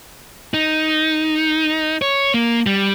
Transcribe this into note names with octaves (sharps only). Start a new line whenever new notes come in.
D#4
C#5
A#3
G3